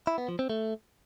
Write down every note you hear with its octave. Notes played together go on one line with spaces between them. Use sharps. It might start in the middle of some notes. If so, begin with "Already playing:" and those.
E4
B3
F3
C4
A3